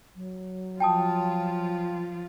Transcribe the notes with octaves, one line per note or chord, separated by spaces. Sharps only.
F#3
F3 F4 G5 A5 D#6